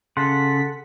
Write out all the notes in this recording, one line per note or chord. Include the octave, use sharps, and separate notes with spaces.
C#3 A4 F#5 C6 B6